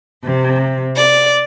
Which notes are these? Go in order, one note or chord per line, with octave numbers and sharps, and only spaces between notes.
C3
D5